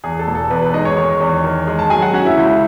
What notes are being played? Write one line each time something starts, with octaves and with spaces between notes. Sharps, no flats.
E2 G#4
A4
E1
A4
E2 B3 B4
B3 B4
G#3 D#4 D#5
C#5 C#6
D#3 C#5 C#6
E2
D#3
G#3
A5
F#3 G#4 G#5
F#4 F#5
C#4 F#4 F#5
E4 E5
C#2